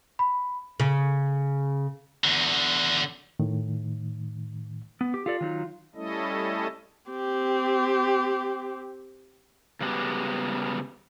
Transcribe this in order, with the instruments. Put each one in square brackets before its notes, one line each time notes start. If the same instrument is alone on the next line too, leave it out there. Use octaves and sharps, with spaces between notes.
[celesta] B5
[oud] C#3
[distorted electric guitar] E2 D3
[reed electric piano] A2 D#3
[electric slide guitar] B3
G4
[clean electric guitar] F4 [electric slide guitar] G4 A4 D5
[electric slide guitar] D#3 F#3 D#4
[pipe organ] G3 A3 C#4 E4 A4 D#5
[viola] C4 G4
[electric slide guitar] C#3 G3 G#3 B3 F#4 G4